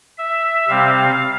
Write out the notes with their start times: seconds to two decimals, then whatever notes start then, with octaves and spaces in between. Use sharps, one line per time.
0.18 E5
0.68 C3 G3 C4 F5